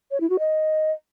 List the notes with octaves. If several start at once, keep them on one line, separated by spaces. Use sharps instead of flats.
C#5
E4
F#4
D#5